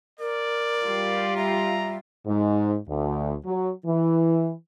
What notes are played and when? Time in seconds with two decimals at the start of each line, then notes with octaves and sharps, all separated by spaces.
0.20 A#4 D5
0.83 G3 F4 G4
1.37 E5 A#5
2.27 G#2
2.89 D2
3.46 F#3
3.87 E3